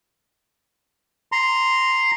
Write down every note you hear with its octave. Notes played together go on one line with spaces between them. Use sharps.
A#5 C6